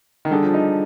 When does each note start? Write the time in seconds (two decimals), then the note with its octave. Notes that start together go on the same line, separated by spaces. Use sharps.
0.25 D#3
0.31 D3 G3 D4 G#4
0.43 F3
0.54 D#4